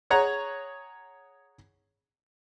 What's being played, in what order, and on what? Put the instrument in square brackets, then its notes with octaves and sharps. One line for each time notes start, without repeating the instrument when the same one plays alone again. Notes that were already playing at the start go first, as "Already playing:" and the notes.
[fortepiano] G#4 C#5 F#5 A#5